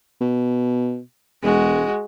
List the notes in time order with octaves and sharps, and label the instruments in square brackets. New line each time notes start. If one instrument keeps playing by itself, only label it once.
[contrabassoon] B2
[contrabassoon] E1 [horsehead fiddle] G#3 F#4